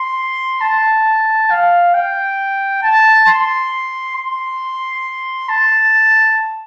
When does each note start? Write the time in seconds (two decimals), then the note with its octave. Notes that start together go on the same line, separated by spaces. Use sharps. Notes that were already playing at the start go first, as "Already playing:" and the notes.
Already playing: C6
0.61 A5
1.50 F5
1.94 G5
2.83 A5
3.27 C6
4.16 C6
5.49 A5